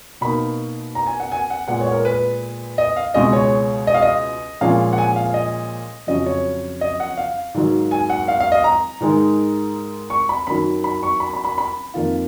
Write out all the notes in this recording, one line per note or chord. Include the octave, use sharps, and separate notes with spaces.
B2 A#3 D#4 B5
A#5
G#5
F#5
G#5
F#5
A#2 G#3 B3 F#5
C#5
A#4
B4
D#5
F5
C#2 B2 G#3 D#5
C#5
D#5
F5
D#5
A#2 F3 G#3 C#4 F4 F5
F#5
G#5
F5
D#5
F2 C#3 F#3 C#4 F4 D#5
C#5
D#5
F#5
F5
G#2 D#3 F#3
G#5
F#5
F5
F5
D#5
A#5
G#2 D#3 G#3 D#4
C#6
B5
F#2 D#3 F#3 B5
B5
C#6
B5
B5
B5
B5
F2 D#3 A#3 F4